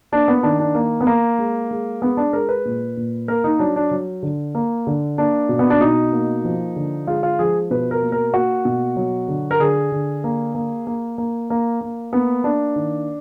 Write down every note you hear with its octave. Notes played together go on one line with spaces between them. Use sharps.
A#3 D4
B3
D#3 D4
D4
A#3
B3
A#3
G#3
G#3
G#3 B3
D4
G#3 A#4
B4
A#2
A#2
A#3 A#4
D#4
F#3 D4
D4
F#3
D3
A#3
D3
A#3 D4
B2
B3
D4
B2 D#4
A#3
F3
D3
G#3 F4
F4
F3 G#4
B2 B4
A#4
A#3
A#4
A#3 F#4
B2
F#3
D3
A#4
D3 G#4
D3
A#3
A#3
A#3
A#3
A#3
A#3
A#3 B3
A#3 D4
D#3